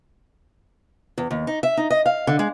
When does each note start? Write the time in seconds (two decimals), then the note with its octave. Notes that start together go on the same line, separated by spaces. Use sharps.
1.18 E2
1.31 D#2
1.47 D#4
1.63 E5
1.77 D#4
1.90 D#5
2.06 F5
2.27 D3
2.39 G#3